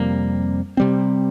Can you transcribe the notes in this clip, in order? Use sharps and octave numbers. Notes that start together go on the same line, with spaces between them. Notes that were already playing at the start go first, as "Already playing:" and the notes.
Already playing: F2 C3 G3 A#3
C3 G3 C4